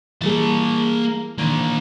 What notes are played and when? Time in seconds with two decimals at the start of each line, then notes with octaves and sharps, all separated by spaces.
0.22 E3 G3 A#3 G#4 A5
1.38 D#3 E3 A#3 D4